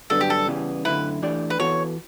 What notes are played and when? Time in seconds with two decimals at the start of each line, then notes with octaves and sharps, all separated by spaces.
0.10 G2 D3 F#3 B3 D4 A4
0.21 G4
0.30 A4
0.48 C#3 E3 G3 B3
0.85 F#2 D3 A3 E4 B4
1.22 E3 A3 D4 G4 D5
1.50 B4
1.59 E3 B3 F#4 A4 C#5